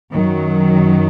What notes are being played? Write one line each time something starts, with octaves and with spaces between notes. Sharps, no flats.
F#2 D#3 F#3